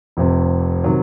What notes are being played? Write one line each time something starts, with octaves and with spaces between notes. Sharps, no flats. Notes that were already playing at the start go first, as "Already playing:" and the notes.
F1 F2 C3
C3 D#3 F#3